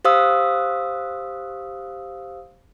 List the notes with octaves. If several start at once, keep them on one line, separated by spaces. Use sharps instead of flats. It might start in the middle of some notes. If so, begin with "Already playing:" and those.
G4 C5 F5 D#6 E6